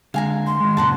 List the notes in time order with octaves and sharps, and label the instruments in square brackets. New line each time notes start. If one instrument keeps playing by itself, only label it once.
[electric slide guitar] D3 G#3 [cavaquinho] F5 G#5 A#5
[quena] C6
[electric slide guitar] D#3 G#3
[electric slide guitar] F#2 A#2 C#3 [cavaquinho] A#4 F#5 A5